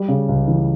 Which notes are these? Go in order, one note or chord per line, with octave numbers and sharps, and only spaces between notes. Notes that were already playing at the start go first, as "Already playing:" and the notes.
Already playing: G3
C#3
C#2
E3